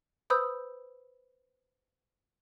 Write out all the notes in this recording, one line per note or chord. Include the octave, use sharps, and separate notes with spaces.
B4 C5 B5 D#6 E6 G6